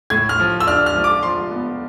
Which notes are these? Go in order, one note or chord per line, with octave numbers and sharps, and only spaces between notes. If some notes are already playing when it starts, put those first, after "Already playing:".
A2 G#6
F6
F3
E6
D4 F6
F6
F3
D6
F3 C6
B3